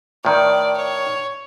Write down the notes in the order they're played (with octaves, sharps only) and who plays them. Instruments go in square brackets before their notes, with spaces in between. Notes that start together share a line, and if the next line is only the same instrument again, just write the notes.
[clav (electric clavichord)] A2 D#3 [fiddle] D5
[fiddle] C#5